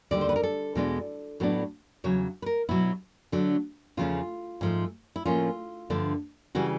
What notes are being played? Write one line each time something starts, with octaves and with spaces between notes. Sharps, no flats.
D#2 D3 G3 D5
C5
B4
A#4
A4
E2 B2 G#3 B3 D4
A2 F#3 B3 D4
E2 C#3 F#3 C#5
B4
A#4
B2 F#3 B3 E4
D3 F#3 A3 D4
E2 C#3 F3 A3 C#4 F4
G#2 F3 A3
E4
A2 F3 A#3 C#4 F4
G2 D3 F3 A3
C#3 E3 G3 F#4